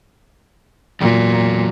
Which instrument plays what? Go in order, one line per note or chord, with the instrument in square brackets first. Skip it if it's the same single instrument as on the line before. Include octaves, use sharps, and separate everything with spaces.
[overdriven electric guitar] E2 F#3 [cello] A#2